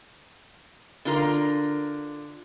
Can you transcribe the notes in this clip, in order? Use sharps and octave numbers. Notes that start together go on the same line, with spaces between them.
D3 F4 A#4